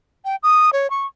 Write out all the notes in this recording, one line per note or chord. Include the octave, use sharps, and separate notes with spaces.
G5
D#6
C#5
C#6